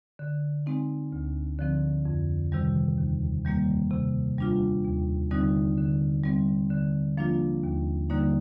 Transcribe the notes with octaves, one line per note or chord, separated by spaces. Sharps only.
D3
G#3 C4 D#4
D2
D3 F3 C4
F2
C3 D#3 G3
D#2
D#3 G3 A#3
C3
G3 D4 F4
D#2
D3 G3 C4 D#4
D3
G3 C4
D3
F3 A#3 D4 F4
D#2
D3 G3 A#3 D#4